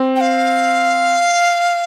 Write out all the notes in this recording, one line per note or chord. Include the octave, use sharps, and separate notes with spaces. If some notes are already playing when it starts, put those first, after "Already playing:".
Already playing: C4
G5
F5